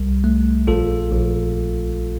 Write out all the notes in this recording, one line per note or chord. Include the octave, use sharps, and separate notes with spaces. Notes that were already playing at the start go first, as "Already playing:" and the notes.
Already playing: C2 G3
A3
A#1 F4 A4
A#1